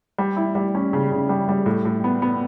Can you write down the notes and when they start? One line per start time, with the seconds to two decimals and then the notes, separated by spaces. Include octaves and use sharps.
0.18 G3
0.36 E4
0.55 G3
0.75 C#4
0.93 C#3
1.12 C#3
1.29 G3
1.49 G3
1.66 A2
1.85 A2
2.04 B3
2.22 B3